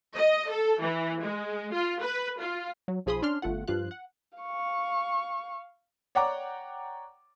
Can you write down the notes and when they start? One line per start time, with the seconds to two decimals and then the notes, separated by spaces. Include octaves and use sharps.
0.16 D#5
0.49 A4
0.81 E3
1.22 G#3
1.73 F4
2.02 B4
2.40 F4
2.88 F#3
3.06 B1 F3 G#4 B5 C6 D#6
3.22 C#4 D4 D5 C6 F6
3.42 G1 A3 F4 F#5
3.67 G2 F3 F4 F5 F#6
3.91 F#5
4.38 F5 C#6
6.15 C#5 D5 F#5 G5 A#5 D6